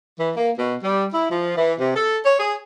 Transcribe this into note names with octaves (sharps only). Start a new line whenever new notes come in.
E3
A#3
B2
G3
E4
F3
E3
C3
A4
C#5
G#4